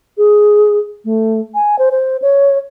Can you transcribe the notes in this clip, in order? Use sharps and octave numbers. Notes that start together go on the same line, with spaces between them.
G#4
A3
G#5
C5
C5
C#5